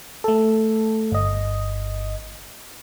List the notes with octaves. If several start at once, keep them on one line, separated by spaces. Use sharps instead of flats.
A3 A4
G1 D#5